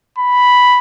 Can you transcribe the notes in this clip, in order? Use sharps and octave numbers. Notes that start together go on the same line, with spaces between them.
B5